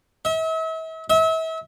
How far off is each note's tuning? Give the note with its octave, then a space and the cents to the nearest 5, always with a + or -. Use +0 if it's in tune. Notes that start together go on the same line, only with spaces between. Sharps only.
E5 -40
E5 -35